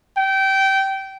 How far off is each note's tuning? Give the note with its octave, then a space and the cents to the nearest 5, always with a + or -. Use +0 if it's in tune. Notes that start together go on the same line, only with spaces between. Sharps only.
G5 -20